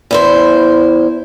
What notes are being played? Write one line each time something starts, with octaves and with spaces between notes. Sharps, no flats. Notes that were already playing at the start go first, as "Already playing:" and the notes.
E2 E4 C5